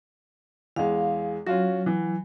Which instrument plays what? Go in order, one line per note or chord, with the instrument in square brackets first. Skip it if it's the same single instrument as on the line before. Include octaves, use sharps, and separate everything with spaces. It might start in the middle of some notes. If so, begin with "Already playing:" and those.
[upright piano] E2 G#3 [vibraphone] F5
[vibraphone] F#3 [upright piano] C#4 F4 F#4
[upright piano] E3